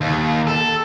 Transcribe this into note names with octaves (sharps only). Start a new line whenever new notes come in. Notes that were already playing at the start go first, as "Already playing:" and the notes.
D#2
A4